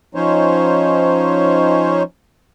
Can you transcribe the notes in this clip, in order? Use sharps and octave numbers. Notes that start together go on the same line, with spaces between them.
F3 C#4 D#4 C5 C#5